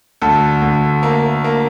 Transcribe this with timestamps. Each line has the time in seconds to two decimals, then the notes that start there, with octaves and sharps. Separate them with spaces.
0.22 D2 A4
0.62 D2
1.03 A#3
1.44 A#3